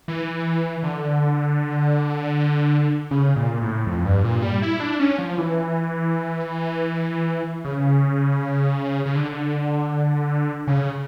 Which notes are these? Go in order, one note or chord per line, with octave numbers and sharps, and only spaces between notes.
E3
D3
C#3
A#2
A2
F2
G2
A#2
G3
E4
D4
C#4
F3
E3
C#3
C#3
D3
C#3